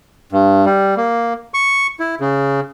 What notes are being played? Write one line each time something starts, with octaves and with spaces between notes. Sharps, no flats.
G2
G3
A#3
C#6
E4
C#3